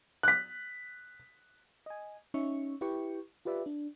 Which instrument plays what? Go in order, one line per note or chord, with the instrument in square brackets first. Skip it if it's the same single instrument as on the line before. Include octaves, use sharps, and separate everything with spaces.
[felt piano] F#6 B6
[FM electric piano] D#5 G#5
C#4 D#4 E5 C#6
E4 G4 B4 G5 C#6
F4 G4 B4 D5 E5
D4